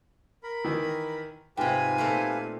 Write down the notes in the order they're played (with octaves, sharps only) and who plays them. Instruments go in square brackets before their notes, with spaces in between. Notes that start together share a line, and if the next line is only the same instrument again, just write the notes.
[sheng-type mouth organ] A#4 B5
[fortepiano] D#3 E3
[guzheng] G#2 C3 [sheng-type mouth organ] F4 G4 B4 [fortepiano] G5 [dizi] G#5
[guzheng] A#2 A3 C4